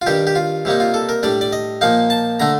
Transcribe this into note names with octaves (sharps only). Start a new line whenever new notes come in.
F4
G2 D#3 G3 D4 G4
G4
F4
C3 G3 A#3 D#4
F4
A4
A#4
A2 G3 D4 D5
D5
D#5
A#2 F3 A#3 D#4 F5
A5
D3 A3 D4 A#5